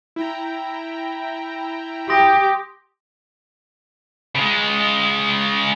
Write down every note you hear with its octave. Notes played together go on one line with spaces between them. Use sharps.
E4 G5 A#5
G4 C6 D#6 A#6
C#3 G#3